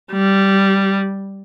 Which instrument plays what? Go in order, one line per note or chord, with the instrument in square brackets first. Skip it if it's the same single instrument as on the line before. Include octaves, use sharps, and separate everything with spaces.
[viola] G3